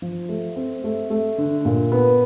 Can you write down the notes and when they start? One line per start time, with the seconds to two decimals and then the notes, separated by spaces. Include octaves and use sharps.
0.02 F3
0.29 A3
0.56 C4
0.84 A3
1.10 A3
1.38 D3
1.65 A#2
1.92 B3